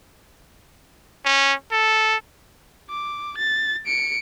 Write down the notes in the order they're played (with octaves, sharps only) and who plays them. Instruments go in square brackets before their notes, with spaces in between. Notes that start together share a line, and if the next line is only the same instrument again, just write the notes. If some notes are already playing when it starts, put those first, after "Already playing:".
[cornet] C#4
A4
[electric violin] D6
A6
C#7 D7